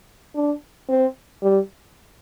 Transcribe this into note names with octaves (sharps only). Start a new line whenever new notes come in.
D4
C4
G3